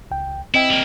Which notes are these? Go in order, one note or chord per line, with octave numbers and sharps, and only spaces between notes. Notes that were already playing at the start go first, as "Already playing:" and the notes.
C#2 G5
C4 E4 D#5 G5
G3 A#3